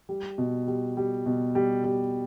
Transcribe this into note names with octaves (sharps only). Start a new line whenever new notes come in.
G3
B2
G3
G3
B2
G3
G3